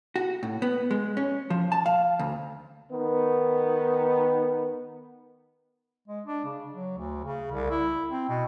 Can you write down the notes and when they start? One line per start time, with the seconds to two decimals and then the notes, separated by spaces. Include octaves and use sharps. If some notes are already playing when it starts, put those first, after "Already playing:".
0.16 F#4
0.43 A2
0.62 B3
0.91 G#3
1.17 C#4
1.50 F3
1.72 A5
1.86 F5
2.19 D2
2.90 D#3 B3
6.08 G#3
6.27 D4
6.45 C#3
6.72 F#3
6.98 D2
7.25 C#3
7.51 C2
7.70 E4
8.11 C4
8.29 B2